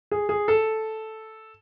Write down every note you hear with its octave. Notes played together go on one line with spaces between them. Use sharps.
G#4
G#4
A4